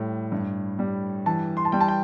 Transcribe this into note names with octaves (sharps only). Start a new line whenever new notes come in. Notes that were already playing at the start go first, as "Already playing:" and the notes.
Already playing: A2 G3
G2
G3
E3 A5
C6
A5
G3 G5
A5
G5